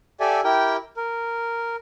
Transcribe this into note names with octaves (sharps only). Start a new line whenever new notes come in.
G4 A4 D5 E5 G#5
E4 G4 A#4 G5
A#4